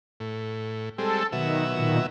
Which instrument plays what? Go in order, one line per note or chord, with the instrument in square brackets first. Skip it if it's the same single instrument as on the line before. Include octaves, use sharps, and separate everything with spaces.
[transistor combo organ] A2
[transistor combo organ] G3 G#3 C4 [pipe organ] A4
[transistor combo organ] B2 F#3 E5 [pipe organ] D#3
[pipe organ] A#2 D#3